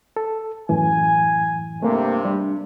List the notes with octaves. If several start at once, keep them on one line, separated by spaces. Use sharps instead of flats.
A4
F#2 A2 E3 G#5
G2 C3 A3 A#3
G3 D4